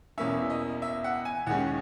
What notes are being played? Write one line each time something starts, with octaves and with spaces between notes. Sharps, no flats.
E2 B2 A#3 C#4 E5
D#5
E5
F#5
G#5
D#2 D#3 G#3 C#4 F#5